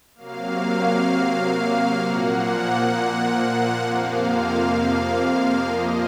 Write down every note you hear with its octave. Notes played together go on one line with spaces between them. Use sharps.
C3 F#3 A#3 F5
A#2 F3 A#3 F#5
F2 C3 F3 A#3 F5
A#2 F3 A#3 D#5